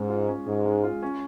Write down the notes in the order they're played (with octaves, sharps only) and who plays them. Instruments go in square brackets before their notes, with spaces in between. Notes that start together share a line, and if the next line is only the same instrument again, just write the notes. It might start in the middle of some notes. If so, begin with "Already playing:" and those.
Already playing: [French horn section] G#2 [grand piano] G#3 C#4 G#4
[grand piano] F4
C#4
[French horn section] G#2 [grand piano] G#4
[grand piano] G#3
F4
C#4